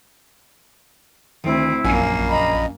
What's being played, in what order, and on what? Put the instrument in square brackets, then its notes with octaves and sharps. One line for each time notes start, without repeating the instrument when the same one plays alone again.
[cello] D2 C4 [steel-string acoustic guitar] D#3 [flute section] E4
[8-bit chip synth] A#1 [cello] F#2 A#3 [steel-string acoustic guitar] C#4 F5 G#5
[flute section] D#5 A#5 B5